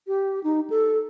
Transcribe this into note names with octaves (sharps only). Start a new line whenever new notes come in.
G4
D#4
A4